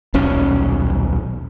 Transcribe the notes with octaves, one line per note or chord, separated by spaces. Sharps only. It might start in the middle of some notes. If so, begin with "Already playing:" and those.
D#1 B1 C#4